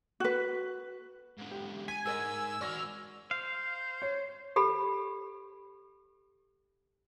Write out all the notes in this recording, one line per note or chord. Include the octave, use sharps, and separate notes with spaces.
F#4 B4
G#2 D3
G4
G#5 B6
G#2 G#4 A#4 D#5 E6
G#2 F#4 D5 C#6 F6 A#6
C5 F5
C#5
G4 A4 B5